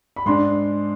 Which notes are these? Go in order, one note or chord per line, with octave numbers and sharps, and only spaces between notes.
B5
G#2 G#3 D4 C6